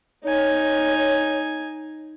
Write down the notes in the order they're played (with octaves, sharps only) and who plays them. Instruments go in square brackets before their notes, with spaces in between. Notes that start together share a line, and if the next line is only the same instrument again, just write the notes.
[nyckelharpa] D#4 G#5 [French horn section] C#5